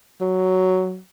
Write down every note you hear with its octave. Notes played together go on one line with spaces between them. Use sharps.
F#3